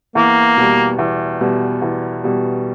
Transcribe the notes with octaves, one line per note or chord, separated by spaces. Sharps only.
E2 A#3
B2 G3
E2
B2 G3
E2
B2 G3